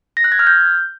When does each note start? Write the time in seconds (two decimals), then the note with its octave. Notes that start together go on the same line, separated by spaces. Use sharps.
0.17 A#6
0.24 F#6
0.32 G#6
0.39 F6
0.47 G6